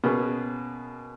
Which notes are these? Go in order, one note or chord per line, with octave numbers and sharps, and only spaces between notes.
B2 A#3 C#4 G#4 B4